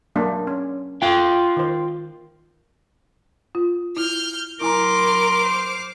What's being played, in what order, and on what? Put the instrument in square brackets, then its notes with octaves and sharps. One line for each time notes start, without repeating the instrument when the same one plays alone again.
[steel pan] F#3 A#3 D4
C#4
[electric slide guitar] F4 G5
[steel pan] D#3 C5
[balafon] F4
[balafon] E4 [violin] F6 G6
[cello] F#3 A#4 [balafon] E4 G#5 A#5 [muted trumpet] C6 [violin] D6 F6
[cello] C5